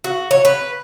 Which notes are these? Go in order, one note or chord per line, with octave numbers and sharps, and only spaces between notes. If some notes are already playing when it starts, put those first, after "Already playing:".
F#4
C#5
B4